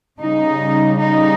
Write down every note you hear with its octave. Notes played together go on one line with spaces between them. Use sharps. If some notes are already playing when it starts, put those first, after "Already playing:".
C#3 G3 D#4
D#4